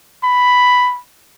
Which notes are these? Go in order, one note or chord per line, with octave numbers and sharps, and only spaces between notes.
B5